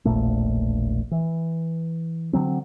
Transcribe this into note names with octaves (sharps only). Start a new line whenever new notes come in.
E1 A#1 A#2 A3
E3
D3 F#3 C4